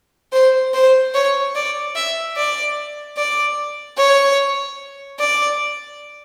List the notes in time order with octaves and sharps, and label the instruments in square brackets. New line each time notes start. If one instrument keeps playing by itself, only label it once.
[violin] C5
C5
C#5
D5
E5
D5
D5
C#5
D5